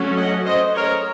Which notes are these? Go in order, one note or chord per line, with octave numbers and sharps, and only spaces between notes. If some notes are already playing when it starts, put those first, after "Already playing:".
Already playing: F#3 A3 C#4
D#5 F#5
C5 D#5
A#4 C#5